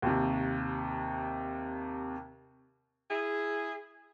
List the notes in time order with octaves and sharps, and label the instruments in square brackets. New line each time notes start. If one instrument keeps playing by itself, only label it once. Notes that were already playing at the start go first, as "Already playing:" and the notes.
[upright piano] D#2 C3
[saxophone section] E4 G#4